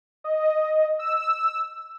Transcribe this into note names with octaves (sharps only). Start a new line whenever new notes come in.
D#5
E6